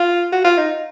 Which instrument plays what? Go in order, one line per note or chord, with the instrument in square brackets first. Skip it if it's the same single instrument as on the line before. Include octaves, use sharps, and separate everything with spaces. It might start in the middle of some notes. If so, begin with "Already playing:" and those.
Already playing: [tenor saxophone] F4
F#4
F4
D#4